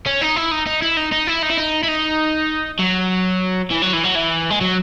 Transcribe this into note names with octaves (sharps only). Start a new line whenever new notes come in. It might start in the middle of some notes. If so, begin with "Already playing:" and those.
C#4
D#4
E4
D#4
D#4
E4
D#4
D#4
E4
D#4
E4
D#4
E4
D#4
F#3
E3
F#3
E3
F#3
E3
G#3
F#3